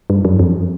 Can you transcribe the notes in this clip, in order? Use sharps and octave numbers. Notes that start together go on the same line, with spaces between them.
G2
F#2
F2